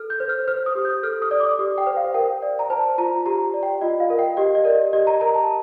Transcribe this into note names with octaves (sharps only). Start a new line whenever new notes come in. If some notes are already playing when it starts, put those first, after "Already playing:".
Already playing: A4 F6
G6
C5
F6
C5 F6
D#6
G4
G6
A4 F6
D#6
D5
D6
G4 D#6
G5
C5
F5
A#4 G5
D5
A#5
C5 A5
F4 A#5
G4 A#5
D5
G5
F4 D#5
F5
A#4
G5
G4 D#5
D#5
A#4 D5
G4 D#5
A#5
A#4 A#5
A5